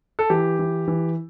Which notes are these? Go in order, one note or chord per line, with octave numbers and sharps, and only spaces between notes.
A4
E3 G4
E3
E3